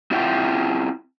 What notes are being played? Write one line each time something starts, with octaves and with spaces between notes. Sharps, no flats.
C4 E4 F4 E5 F#5 G5